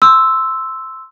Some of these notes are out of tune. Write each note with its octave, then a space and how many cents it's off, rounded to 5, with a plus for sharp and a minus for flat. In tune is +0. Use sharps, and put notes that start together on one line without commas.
C6 +0 E6 +0